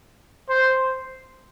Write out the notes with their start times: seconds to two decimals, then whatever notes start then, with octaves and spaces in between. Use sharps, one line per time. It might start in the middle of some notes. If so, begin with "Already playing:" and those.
0.49 C5